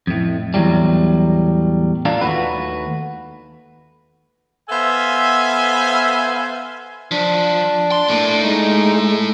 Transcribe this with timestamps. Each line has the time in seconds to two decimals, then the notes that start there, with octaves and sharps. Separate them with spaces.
0.07 F2 A2
0.54 E2 A2 F#3 G3
2.05 A#3 D4 F4 A4
2.21 D#2 A3 F#4 B4
4.69 B3 A4 C5 E5 F5 G#5
7.11 F3 D4
7.92 C6
8.08 A2 A#3
8.43 G#3 D#4